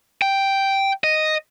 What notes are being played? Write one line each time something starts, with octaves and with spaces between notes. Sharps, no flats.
G5
D#5